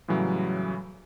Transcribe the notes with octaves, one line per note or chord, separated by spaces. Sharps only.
A2 C#3 E3 F#3 G3